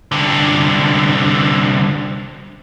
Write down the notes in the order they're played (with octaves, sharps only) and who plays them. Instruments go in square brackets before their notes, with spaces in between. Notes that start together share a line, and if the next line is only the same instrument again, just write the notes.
[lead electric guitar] C2 D3